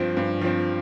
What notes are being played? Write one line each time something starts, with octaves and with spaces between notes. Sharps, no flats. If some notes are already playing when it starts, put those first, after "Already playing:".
Already playing: G2 F3 C4 C5
G2
F3 C4